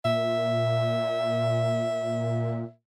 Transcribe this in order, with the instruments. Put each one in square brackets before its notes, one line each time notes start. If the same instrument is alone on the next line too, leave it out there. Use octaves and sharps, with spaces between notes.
[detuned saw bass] A#2 [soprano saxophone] E5